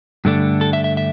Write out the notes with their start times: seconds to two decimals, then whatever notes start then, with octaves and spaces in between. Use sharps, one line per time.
0.25 G2 D3 A3 D4
0.61 A4
0.73 E5
0.84 E5
0.97 E5